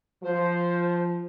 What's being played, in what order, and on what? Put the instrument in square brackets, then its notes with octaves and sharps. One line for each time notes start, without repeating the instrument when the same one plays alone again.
[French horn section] F3 [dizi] C5